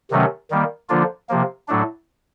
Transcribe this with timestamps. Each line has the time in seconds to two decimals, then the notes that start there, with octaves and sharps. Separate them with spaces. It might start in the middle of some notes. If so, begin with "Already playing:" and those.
0.11 C3 D#3 F#3 A3 C#4
0.51 D#3 G3 A#3
0.89 D3 F3 A#3 D4 F4
1.29 C3 F3 A#3
1.68 A2 F#3 A3 D4